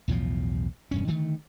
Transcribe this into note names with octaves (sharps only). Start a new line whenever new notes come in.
B1 E2 A2 F3
E1 G2 C#4
D3 D#3 A3